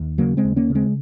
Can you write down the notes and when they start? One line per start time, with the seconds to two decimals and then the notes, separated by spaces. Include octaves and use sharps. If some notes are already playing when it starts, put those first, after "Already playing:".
Already playing: D#2
0.18 C#3 F#3 A#3
0.37 G#3 C4
0.44 D#2
0.56 A#3 C#4
0.70 C#3
0.75 G#3 C4